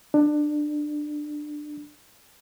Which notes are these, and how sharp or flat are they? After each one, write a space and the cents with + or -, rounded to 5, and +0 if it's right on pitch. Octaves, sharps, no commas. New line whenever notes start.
D4 +20